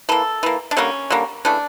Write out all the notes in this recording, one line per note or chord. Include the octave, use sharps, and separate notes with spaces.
E3 A#3 A4
E3 A#3
D4
D3 G3 A#3 C#4
D3 G3 A#3
C#3 E3 A3 D4